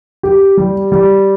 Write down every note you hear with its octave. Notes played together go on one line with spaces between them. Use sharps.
G4
G3
G3